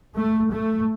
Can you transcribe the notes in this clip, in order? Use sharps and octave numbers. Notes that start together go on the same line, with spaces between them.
A3
A3